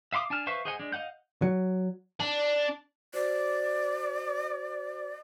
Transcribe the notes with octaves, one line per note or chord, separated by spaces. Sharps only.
E5 F5 C6 D6 D#6
D4 G#5 A5 F6
B4 C5 E5 F5 C#6
G#4 C5 D#5 F#5 G#5
G#3 D4
D#5 F5 F#5 G6
F#3
D4
F#4 C5 D5